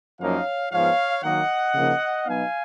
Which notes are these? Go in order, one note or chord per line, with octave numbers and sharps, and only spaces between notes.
F#2 F3 A#3 D#4 C#5 F5
G#2 F3 B3 C#5 F5
D#3 F#3 A#3 D#5 F#5
C#3 F3 A#3 D#4
B2 F#3 B3 D#4 F5 G#5